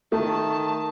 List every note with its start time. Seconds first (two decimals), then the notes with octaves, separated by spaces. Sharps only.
0.12 D#3 A3 A5